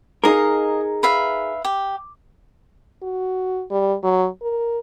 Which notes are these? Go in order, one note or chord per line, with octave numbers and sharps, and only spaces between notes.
D#4 G#4 A#4 D#5 F5
B4 E5 F5
G4
F#4
G3
F#3
A#4